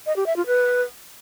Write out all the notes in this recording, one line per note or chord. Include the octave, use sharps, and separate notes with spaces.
D#5
G4
E5
F4
B4